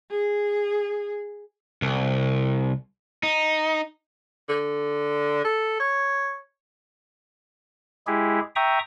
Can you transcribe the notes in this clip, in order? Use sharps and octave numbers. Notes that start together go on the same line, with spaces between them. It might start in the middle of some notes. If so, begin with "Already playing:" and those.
G#4
C2
D#4
D3
A4
C#5
G#3 E4 G4 G#4
E5 G5 A#5 C#6 D#6